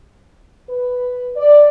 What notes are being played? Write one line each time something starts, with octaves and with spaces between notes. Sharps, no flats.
B4
D5